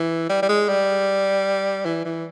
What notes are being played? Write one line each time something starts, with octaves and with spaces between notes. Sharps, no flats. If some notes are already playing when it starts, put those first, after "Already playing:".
Already playing: E3
G3
G3
G#3
G3
E3
E3